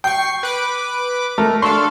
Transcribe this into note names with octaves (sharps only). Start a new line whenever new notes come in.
G5 C#6 C7
B4 D6
A3 A#4
D4 A4 F5 C6 C#6